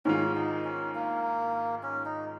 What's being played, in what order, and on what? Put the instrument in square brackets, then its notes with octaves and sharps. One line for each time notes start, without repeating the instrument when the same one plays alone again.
[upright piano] G#2 D#3 G#3 F4 [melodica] C#4
[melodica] D#4
C#4
A#3
C#4
D#4